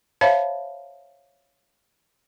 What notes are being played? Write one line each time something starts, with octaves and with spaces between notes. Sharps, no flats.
C5 C#5 E5 F5 A5 B5